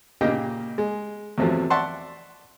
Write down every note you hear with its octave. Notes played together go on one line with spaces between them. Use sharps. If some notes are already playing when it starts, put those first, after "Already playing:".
A#2 C#3 A#3 G4 D#5 G5
G#3
E2 C3 F3 F#3 A3
D5 E5 F#5 A5 C6 C#6